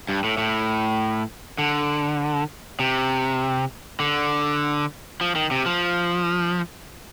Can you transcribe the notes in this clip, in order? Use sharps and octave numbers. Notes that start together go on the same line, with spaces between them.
G2
A2
A2
D3
C3
D3
F3
D#3
C3
F3